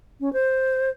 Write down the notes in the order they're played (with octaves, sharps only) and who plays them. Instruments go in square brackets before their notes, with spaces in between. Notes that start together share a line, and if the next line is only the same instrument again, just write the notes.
[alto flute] C#4
C5